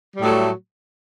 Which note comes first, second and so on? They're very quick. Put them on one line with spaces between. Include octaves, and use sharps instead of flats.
G3 A2 F#3 A3